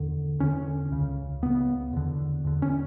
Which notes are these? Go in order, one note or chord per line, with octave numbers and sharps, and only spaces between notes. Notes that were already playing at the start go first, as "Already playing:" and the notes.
Already playing: E2 D3
E2 D3 C#4
C#2 C#3
C#2 C#3 B3
E2 D3
E2 D3
C#4